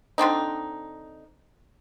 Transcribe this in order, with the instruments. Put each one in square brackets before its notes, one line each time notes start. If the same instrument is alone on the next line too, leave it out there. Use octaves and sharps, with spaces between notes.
[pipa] D3 C4 D4 D#4